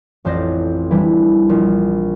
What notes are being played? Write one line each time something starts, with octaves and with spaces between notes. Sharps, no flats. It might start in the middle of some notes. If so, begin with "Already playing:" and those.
A1 F2 C5 D5 A#6
E3 G3 D4 E4
A#1 F4